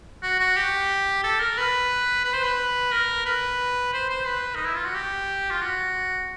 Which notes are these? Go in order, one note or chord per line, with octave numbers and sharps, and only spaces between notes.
F#4
F#4
G4
A4
A#4
B4
B4
C5
B4
A#4
B4
C5
C5
B4
D#4
E4
F4
F#4
G4
F4
F#4